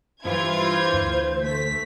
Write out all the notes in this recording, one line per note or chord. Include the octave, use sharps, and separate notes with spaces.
G2 E3 F4 C5 G#6
C5
D2
A3 B6